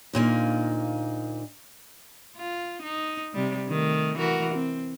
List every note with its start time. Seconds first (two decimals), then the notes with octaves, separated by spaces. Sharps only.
0.13 D2 A#2 A#3 D#4
2.37 F4
2.83 D#4
3.34 C3 G3
3.69 D#3 A3
4.18 E3 F#4 A#4
4.54 C4